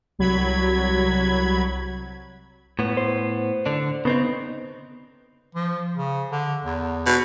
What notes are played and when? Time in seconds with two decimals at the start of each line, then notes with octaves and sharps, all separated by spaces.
0.19 C2 F#3 B5 G#6
2.79 A2 B3
2.97 C5
3.66 D3 D4
4.05 C#3 B3 C4 D#4
5.55 F3
5.96 C#3
6.32 D3
6.65 E2
7.06 B2